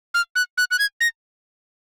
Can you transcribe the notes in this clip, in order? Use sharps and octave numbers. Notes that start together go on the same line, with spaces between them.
F6
F#6
F#6
F#6
G#6
A#6